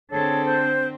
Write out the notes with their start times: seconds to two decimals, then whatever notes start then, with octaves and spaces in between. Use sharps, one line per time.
0.11 D3 C4 G#4 A4 C#5 A5
0.46 C5